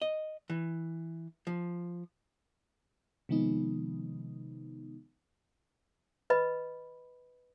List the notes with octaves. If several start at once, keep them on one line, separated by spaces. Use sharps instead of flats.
D#5
E3
F3
C3 D#3 F3 G#3 B3 D#4
B4 D#5 B5